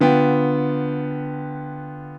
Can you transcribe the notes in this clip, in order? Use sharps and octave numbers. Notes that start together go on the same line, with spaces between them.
D3 B3 F4 G5